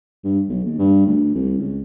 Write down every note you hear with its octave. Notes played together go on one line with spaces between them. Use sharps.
G2
B1
D#2
G2
D2
C2
C#2